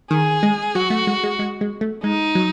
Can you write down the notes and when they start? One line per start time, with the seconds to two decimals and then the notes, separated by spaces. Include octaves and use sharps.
0.11 D#3 G#4
0.43 G#3
0.75 F#3 F#4
0.90 A3
1.07 G#3
1.24 G#3
1.39 G#3
1.61 G#3
1.81 A3
2.03 G#3 D#4
2.35 F#3